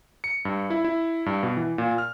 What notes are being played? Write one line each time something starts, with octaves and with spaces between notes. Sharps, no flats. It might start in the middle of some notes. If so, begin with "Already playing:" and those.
C#7
G2
E4
E4
G2
B2
E3
A#2
F6